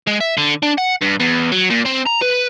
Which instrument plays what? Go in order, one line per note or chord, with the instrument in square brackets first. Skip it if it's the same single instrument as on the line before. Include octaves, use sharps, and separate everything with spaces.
[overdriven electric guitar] G#3
E5
D3
D4
F#5
G2
E2
F#3
A#2
C4
A#5
B4